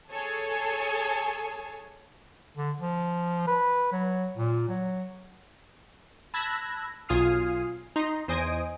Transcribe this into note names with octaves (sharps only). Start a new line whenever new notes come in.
G#4 A4 C#5 G#5 A5
D3
F3
B4
F#3
A#2
F#3
A5 B5 E6 F#6 G#6 A#6
B1 F4 G#5 D#6 F6 C7
D#4 A#5 C6
E2 C5 D#5 G#5 D#6 D7